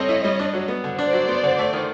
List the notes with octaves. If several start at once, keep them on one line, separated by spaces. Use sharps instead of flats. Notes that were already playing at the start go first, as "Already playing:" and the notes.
Already playing: G3 C4 A4 C#5 D#5
E4
G3
D4
F#3
B3
D3
D4 C5 D5
F#3
B3
D3
A3
D#3